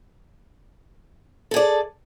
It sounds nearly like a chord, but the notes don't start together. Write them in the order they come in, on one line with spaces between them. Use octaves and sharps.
A4 G#4 D5